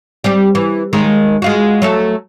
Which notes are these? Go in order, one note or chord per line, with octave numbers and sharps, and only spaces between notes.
G3 C4 G4
E3
D#2 D#3 G#3
G#3 F4 F#4
F#3 A3 A4